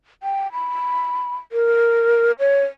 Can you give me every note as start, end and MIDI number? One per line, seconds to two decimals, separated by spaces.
0.23 0.51 79
0.52 1.35 83
1.52 2.32 70
2.39 2.63 73